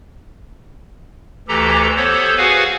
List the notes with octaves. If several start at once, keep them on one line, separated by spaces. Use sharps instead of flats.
D2 E3 G4 A4 A#5
B3 A4 C5 C#5
F#4 G#4 B4 F5 F#5 G#5